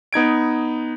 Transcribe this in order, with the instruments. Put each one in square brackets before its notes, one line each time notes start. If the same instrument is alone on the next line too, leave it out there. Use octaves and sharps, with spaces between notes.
[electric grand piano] B3 D#4 G#6 D7